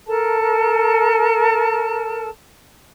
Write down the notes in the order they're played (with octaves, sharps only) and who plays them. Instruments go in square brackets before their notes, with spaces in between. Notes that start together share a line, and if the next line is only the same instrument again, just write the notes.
[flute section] A4 A#4 A5